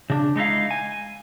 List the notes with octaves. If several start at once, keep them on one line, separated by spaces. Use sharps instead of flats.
C#3 D4
G#3 D#4 E4 F5
G#5